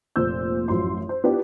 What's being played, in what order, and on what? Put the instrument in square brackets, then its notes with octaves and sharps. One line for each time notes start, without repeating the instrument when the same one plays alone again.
[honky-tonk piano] F1 A#2 C5 E6 G6
A1 F#2 F3 C6
C5
B3 D4 E4 F4 G4